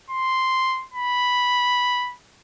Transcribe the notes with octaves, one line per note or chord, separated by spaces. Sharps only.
C6
B5